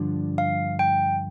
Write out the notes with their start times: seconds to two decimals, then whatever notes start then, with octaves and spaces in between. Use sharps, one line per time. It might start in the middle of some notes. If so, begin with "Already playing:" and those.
Already playing: G2 D3 F3 D4
0.38 F5
0.79 G5